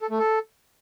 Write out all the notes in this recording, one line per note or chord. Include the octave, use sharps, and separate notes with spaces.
A4
A3
A4